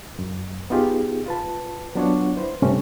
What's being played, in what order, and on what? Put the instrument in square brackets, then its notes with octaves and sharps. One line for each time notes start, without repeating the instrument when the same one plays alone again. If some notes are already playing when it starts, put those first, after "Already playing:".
[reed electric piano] F#2
B3 D#4 F4 G4 G#4
F4 B4 A5
F#3 B3 D4 F4 C#5 F#5
E4 B4 C5
G2 C3 A3 C4 C#4